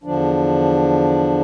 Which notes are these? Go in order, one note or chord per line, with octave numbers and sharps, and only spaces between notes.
E2 D3 F3 D4